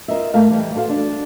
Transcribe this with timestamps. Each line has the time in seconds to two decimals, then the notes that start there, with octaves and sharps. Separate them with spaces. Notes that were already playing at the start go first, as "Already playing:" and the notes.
0.08 F4 A#4 D#5 E5
0.34 A2 A3 A#4 F5
0.50 E3 G3
0.75 F#4 A4 C5 F5
0.90 D4